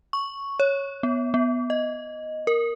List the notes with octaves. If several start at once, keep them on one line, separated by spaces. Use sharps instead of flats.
C#6
C#5
B3
B3
D#5
A#4